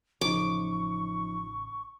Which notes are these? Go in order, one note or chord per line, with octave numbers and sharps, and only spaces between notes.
A1 C#3 F3 D#4 C#6 D6